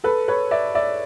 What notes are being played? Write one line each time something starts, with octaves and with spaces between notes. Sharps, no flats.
A4 B4
B4 C#5
D5 E5
D5 E5